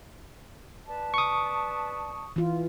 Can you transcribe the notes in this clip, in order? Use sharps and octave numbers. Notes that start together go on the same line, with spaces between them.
B4 D5 A5
C#6 D#6
E3 F4